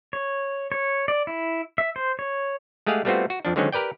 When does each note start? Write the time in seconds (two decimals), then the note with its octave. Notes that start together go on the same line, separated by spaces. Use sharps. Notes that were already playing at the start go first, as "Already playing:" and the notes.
0.13 C#5
0.72 C#5
1.08 D5
1.27 E4
1.78 E5
1.96 C5
2.19 C#5
2.87 G#3 A3 G4 G#4 F5 F#5
3.05 G3 A3 B3 C4 F4 F#4
3.30 F#4
3.45 F2 F3 D4
3.56 D3 D#3 F#3 G#3 C4 C#4
3.72 G4 A#4 B4 D5 G5